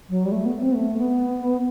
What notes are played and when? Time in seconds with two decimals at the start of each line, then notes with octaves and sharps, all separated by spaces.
0.09 F#3
0.25 G3
0.32 A3
0.45 B3
0.61 C4
0.72 B3
0.75 A3
0.97 B3